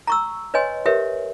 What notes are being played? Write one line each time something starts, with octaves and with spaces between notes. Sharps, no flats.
A#5 C#6 E6
B4 C#5 D#5 G#5 C6
G4 A#4 B4 C#5 E5